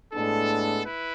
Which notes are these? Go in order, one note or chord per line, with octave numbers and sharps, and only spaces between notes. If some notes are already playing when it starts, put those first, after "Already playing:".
A2 G#3 B3 D4 A4
E4 B4